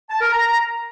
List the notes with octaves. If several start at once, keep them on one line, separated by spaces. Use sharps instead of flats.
A5
A#4
A#5